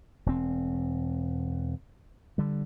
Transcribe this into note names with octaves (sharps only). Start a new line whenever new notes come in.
E1 C4
D3 G3